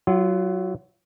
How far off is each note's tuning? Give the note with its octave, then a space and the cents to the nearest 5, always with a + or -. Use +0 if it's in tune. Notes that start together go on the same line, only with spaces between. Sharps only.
F#3 +15 F4 -20 F#5 +20